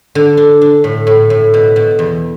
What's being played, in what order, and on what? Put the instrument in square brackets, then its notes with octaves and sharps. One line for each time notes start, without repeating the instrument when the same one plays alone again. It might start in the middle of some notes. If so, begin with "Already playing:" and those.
[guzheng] D3
D4
D4
A2
A2
A2
B2
B2
E2